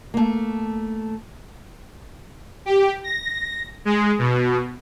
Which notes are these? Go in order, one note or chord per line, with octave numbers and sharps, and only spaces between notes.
A3 A#3
G4
A#6
G#3
B2